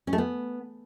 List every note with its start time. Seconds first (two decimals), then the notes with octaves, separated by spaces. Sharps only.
0.07 C#4
0.13 A3
0.18 B3